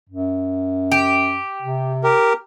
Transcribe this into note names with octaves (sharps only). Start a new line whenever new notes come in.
F#2
G4
C3
G4 A#4